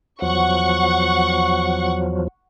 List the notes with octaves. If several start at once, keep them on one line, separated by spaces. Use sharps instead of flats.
E2 F3 F#3 F#5 C#6